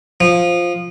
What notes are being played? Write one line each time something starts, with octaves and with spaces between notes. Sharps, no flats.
F3